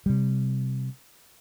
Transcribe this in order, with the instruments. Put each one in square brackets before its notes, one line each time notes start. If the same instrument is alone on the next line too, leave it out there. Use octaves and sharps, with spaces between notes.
[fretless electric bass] C3 G3